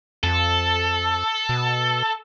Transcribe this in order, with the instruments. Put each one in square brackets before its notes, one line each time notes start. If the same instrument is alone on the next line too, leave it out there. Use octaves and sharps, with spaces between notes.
[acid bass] F2 [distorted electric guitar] A4
[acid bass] B2